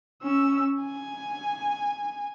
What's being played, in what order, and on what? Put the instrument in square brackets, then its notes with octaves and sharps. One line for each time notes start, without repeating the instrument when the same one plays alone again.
[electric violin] C#4 E6
G#5